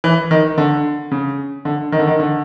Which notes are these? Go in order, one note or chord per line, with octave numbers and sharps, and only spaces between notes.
E3
D#3
D3
C#3
D3
D#3
D3
D#3
D3